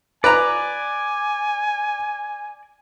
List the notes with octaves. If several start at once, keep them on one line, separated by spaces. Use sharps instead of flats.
B4 D5 G#5 A#5